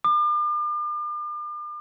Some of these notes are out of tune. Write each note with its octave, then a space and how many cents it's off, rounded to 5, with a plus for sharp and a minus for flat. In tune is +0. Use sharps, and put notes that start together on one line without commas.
D6 +40